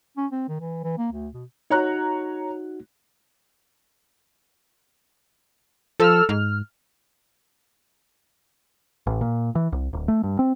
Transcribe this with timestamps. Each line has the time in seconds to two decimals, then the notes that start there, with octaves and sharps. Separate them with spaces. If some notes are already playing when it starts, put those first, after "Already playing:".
0.17 C#4
0.32 C4
0.48 D#3
0.60 E3
0.84 E3
0.98 A#3
1.12 D2
1.34 B2
1.70 D#4 F#4 C#5 A#5 F#6
6.00 F3 A4 E6 F6
6.29 G#2 F6
9.07 A1
9.21 A#2
9.55 E3
9.72 C2
9.93 D1
10.08 A3
10.23 G2
10.39 C4